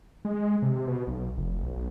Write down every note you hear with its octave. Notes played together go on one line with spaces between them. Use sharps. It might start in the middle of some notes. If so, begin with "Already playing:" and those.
G#3
C3
B2
B1
F1
B1